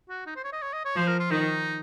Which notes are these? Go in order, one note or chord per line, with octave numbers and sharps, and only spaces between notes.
F#4
D#4
C5
C#5
D#5
C#5
D#5
C#5
F3 C5
A#4
F4
D#3 D#4